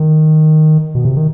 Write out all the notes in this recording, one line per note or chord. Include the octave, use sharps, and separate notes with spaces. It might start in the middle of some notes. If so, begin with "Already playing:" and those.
Already playing: D#3
B2
C3
D#3